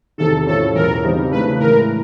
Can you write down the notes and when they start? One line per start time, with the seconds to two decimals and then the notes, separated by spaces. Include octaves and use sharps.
0.18 E2 C3 D#3 A4
0.47 A2 F3 A3 C#4 E4 A4
0.75 E2 B2 F#3 A#4
1.03 C#3 E3 G3 C4 D#4
1.31 C#3 E3 A3 D4 B4
1.60 A2 E3 G#3 A#4